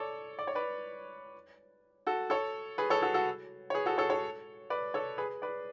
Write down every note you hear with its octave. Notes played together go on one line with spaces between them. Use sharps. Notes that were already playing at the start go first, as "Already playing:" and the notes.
Already playing: A4 C#5 D5
D5
C#5
B4 D5
F#4 A4
A4 C#5
G#4 B4
A4 C#5
F#4 A4
F#4 A4
C#5
G#4 B4
F#4 A4
A4 C#5
A4 C#5
B4 D5
A4 C#5
G#4 B4
B4 D5